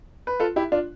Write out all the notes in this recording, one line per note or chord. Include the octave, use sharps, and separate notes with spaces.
B4
F4 A4
E4 G4
D4 F4